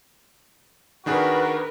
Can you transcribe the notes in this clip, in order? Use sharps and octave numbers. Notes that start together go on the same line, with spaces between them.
D#3 D4 F#4 G#4 A#4 B4